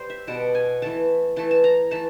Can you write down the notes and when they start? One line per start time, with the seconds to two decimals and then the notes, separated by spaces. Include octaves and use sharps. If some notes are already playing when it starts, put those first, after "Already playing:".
Already playing: G3 C5
0.10 E5
0.27 B2 G3 B3 A5
0.55 G#5
0.82 E3 A3 A5
1.36 E3 A3 A5
1.51 A5
1.64 A#5
1.91 E3 A3 A5